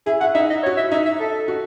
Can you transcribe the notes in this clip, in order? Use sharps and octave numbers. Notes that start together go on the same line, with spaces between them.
E4 G#4
E4 F#5
D#4 E5
D#5
C#5
F#4
E4 E5
D#4 E5
E5
A4
F#4